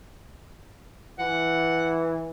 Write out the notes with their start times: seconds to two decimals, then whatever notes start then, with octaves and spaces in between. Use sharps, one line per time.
1.19 E3 F#5